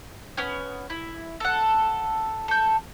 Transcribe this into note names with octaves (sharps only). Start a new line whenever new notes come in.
B3 C#4 G#5
E4
A4 F#5
A4 G6